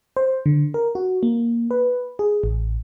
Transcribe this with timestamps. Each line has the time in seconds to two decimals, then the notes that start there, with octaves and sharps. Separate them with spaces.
0.17 C5
0.46 D3
0.74 A#4
0.95 F#4
1.23 A#3
1.71 B4
2.19 G#4
2.43 A1